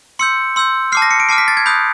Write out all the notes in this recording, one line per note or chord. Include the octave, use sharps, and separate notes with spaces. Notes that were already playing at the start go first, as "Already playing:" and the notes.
C6 E6 G6 C#7
C6 E6 G6
A5 D6 F6 C7
A#6
C#7
D7
A5 D6 F6 C7
B6
A6
G#6
B5 D#6 F#6 G6